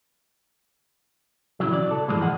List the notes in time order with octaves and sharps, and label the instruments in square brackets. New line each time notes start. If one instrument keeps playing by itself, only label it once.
[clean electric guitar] A#2 C#3 E3 F#3
D5
A4
G#2 E3 F3 G#3 A#3
B1 G#2 G#3 G#4 F#5